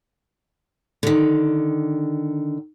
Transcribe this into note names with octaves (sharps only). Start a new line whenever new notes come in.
D3 D#3